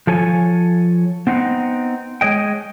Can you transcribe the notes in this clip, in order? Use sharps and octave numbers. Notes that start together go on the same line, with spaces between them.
F3 A4 C#5 G#5
B3 C4 D#4 F#5
G#3 C#5 D#5 G5